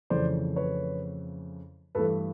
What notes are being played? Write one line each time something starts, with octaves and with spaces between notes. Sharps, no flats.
F2 C#3 E3 A3 C5 D5
B4 C#5
G2 E3 A3 A4 B4